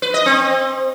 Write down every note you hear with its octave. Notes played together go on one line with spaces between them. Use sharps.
B4
D#5
C4